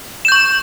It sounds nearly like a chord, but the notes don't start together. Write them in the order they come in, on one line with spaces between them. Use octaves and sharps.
E7 G6 C#6